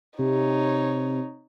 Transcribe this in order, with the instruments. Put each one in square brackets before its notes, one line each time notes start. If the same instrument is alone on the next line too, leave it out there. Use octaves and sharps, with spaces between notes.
[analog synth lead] C3 [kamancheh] D#4 C#5